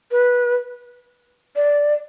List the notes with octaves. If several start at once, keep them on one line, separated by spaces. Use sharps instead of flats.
B4
D5